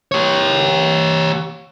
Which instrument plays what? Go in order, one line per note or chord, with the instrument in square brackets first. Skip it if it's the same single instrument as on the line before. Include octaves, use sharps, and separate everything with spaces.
[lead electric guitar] G4 C#5